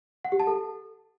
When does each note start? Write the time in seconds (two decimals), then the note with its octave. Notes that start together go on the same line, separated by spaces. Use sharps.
0.25 F#5
0.32 G4
0.40 A5
0.47 A4